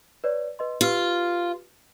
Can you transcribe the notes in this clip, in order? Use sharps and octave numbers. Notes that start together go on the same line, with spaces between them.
B4 C#5 D5
B4 D#5 C6
F4 G4 B4 F6